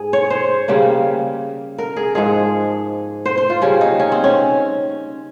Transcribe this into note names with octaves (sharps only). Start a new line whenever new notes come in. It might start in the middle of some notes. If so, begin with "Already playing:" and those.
Already playing: G#2 G#4
C#5
C5
C#3 G3 A#3
A#4
G#4
G#2 F3 G#3 G#4
C5
C5
F4
C#3 G3 A#3 C#4
D#4
C#4
C4
C#4